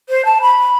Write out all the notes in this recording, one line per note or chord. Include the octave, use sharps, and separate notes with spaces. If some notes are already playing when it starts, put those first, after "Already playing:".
C5
A5
B5